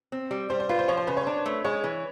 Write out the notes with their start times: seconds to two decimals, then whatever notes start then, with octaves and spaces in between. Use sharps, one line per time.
0.12 C4
0.31 G3
0.50 G3 C5
0.60 C5
0.69 F4 B4
0.79 C5
0.88 F3 C#5
0.97 C5
1.07 C#3 B4
1.17 C#5
1.27 D4
1.46 A3
1.64 G#3 C#5
1.84 E3